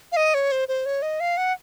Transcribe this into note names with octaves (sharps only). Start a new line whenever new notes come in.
F5
D#5
C#5
C5
C5
C#5
D#5
F5
F#5